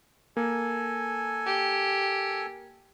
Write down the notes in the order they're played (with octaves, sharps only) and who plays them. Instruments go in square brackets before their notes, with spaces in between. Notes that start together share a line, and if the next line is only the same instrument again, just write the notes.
[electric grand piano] A#3 [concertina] A4 G#5
[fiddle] G4